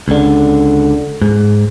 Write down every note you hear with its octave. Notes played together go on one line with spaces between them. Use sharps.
C#2 D3
G#2